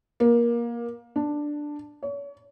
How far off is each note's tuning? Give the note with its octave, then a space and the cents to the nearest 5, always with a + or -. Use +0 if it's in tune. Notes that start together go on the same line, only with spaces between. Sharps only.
A#3 +20
D4 +5
C#5 +35